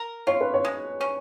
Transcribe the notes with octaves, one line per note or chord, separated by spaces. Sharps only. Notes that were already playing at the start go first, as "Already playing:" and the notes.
Already playing: A#4
F4 C#5
B4
C#5
G#3
C#4